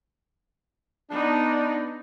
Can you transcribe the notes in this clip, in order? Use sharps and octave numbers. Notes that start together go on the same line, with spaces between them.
B3 D4 D#4